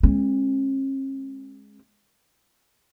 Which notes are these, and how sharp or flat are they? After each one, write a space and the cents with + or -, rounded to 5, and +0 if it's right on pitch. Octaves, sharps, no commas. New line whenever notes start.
G#3 +0 C#4 -45